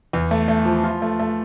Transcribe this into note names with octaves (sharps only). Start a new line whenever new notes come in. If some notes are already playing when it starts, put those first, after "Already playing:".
E2
A3
A3
F3
F4
A3
A3